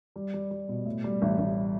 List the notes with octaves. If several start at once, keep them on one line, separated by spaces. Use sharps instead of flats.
G3
G3
G3
B2
A2
G3
A1
A1